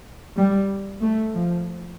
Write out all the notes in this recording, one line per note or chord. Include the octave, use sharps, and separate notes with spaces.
G3
A3
F3